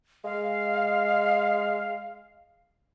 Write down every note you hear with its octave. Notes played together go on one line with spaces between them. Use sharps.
G#3 F5